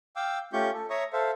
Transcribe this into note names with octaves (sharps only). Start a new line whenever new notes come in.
F5 G5 D6 E6
A3 C#4 F4 G4 C#6 G6
A4
C#5 E5 A#5 C#6 D#6
A4 C5 E5 F5